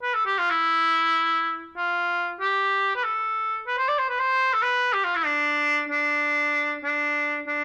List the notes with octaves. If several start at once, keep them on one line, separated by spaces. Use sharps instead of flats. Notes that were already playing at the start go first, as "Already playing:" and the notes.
B4
A4
G4
F4
E4
F4
G4
B4
A4
B4
C5
D5
C5
B4
C5
A4
B4
G4
F4
E4
D4
D4
D4
D4